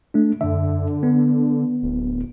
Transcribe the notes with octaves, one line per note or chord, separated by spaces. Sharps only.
A3 D4
F#2 D3 E5
B3
D1